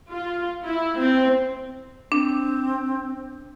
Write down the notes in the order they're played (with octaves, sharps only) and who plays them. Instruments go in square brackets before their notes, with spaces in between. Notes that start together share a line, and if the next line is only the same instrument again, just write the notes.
[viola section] F4
E4
C4
[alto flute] C4 [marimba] D4